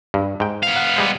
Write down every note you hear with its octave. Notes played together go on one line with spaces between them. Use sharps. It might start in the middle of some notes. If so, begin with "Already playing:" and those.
G2
G#2 G5
B3 F5
F#5
G3 G#3 C5